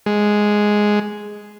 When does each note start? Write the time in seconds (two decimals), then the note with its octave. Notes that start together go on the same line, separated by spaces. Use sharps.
0.06 G#3